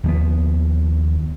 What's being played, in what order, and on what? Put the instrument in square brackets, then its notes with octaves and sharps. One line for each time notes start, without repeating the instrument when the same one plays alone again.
[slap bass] D#2 F3 B3